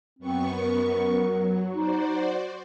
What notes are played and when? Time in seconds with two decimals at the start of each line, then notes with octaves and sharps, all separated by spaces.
0.19 F#2 B3 C4 C#6
0.56 A#4
1.16 F#3
1.74 D#4 F#4 C5 D5